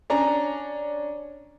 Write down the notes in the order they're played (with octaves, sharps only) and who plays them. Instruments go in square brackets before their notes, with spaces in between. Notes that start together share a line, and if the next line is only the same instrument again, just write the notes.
[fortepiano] C#4 D4 A#5